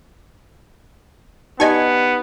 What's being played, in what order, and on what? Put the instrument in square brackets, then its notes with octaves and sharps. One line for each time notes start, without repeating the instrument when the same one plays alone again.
[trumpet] B3 [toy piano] D#4 G4 D5 [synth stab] D#5 G#5 C#6